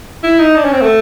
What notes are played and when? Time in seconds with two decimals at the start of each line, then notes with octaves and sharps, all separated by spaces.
0.23 E4
0.39 D#4
0.56 D4
0.65 C#4
0.73 C4
0.82 A3